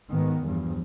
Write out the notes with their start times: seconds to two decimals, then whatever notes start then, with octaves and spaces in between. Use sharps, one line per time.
0.11 G#2 D#3 B3
0.43 E2 G2 F3